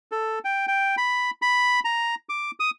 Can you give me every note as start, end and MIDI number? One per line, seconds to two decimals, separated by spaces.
0.12 0.39 69
0.45 0.66 79
0.68 0.95 79
0.98 1.30 83
1.42 1.80 83
1.85 2.15 82
2.29 2.51 86
2.60 2.70 87